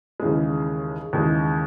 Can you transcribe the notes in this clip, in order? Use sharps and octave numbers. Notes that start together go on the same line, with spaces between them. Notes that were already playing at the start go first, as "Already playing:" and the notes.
D#2 C#3 E3 G#3
D#2 C#3 E3 G#3